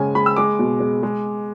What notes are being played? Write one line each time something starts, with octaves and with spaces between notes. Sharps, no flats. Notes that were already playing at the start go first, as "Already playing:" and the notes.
Already playing: C#3 G#3 G#5
G#3 B5
E6
G#3 D6
B2
G#3
G#3